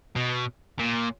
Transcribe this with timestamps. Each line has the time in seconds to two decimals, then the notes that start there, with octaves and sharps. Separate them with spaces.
0.16 B2
0.79 A#2